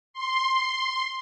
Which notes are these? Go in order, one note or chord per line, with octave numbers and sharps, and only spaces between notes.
C6